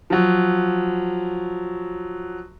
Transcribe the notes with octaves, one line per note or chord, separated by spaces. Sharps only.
F3 F#3